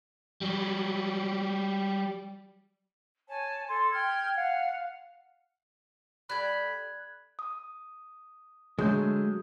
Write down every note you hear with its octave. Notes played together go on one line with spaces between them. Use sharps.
F#3 G3
C#5 G#5 A5
A4 C6
G5 F6 G#6
F5 F#5
G3 A4 B5 F#6 G#6
D#6
D3 F#3 G#3 A3 D#6 G6